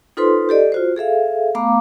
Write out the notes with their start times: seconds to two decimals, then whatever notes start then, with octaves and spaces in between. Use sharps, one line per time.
0.17 D#4 F4 A4 B4 C5 C6
0.49 G4 A4 D5 D#5
0.72 F4 F#4 C5
0.96 G#4 A4 E5 F5
1.55 A3 B3 F5 A#5 D6